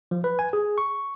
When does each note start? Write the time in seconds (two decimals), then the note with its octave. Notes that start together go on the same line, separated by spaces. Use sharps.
0.11 F3
0.24 B4
0.39 G#5
0.53 G#4
0.78 C#6